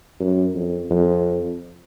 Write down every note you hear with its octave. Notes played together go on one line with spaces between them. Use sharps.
F#2
F2
F2